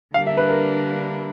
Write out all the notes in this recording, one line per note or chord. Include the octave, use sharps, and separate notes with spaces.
D3 G3 A#3 D4 F5
E5
B4
A#4